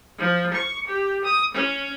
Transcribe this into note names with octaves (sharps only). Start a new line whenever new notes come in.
F3
C#6
G4
D#6
C#4